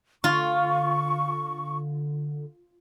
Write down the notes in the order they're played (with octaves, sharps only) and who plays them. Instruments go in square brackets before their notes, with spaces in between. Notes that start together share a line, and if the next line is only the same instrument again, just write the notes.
[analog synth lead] D3 [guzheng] F4 [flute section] C#6